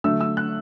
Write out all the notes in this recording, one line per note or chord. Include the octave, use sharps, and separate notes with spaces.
D3 F#3 A3 E6
E6
F#6